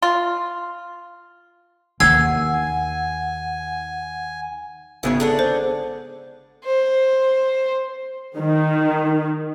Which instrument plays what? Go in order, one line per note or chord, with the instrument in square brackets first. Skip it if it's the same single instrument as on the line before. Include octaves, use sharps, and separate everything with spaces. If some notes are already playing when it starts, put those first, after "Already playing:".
[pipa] F4
[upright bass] D#2 D#3 [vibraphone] F#5 [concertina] G#5 [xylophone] E6 G#6 C7
[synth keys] G#1 C#3 B3 [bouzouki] E4 G#4 C#5
[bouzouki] D3 D4 F#5 [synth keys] G#4
[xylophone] C5
[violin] C5
[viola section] D#3